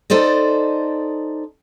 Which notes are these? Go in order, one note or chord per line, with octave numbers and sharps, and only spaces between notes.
D#4 A4 C5 D5 D#5